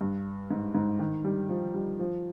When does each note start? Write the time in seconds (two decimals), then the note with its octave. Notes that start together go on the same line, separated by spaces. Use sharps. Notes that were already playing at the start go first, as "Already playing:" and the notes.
0.01 G2
0.51 G#2
0.75 G#2
0.99 D#3
1.24 G3
1.49 F3
1.74 G3
1.99 F3